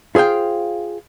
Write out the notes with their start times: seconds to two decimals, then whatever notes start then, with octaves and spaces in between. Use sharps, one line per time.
0.15 F4 G#4 C5 F5 G5